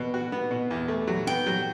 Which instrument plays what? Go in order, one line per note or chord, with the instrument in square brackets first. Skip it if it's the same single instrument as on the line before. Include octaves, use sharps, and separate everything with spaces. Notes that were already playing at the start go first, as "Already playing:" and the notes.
Already playing: [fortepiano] B2
F#4
B3
B2
E2
A3
F#3
[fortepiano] B3 [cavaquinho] G5
[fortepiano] F#3